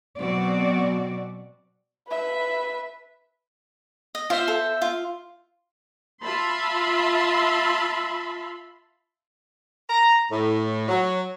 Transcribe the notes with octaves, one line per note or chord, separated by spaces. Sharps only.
B2 F#3 C4 F#4 D5
B4 E5
D#5
B3 F4 C5 E5
A4
F4
F4 E5 A5 B5 C6
A#5
A2
F#3